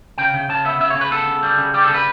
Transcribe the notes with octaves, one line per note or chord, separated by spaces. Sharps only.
C#3 G5
C#3
C#3 A5
B3 E5
C#3 E5
C#5
C#3
B4
B3 A4
C#3
G3
C#3
G3 G4
A4
C#3
B4